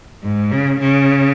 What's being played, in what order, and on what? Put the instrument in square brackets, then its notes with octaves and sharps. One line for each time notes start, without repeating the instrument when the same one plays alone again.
[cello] G#2
C#3
C#3